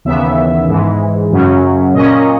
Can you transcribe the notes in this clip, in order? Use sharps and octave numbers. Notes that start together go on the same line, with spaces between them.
D#2 C#3 E3 B3 E5
G#2 E3 G#3
F#2 C#3 F#3 C#4
A#2 A#3 C#4 D#5